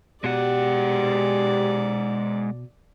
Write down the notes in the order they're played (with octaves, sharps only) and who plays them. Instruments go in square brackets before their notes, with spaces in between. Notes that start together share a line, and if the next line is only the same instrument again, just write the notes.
[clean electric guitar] B2 [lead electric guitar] G#3 F#5 [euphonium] G4 [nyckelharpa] D5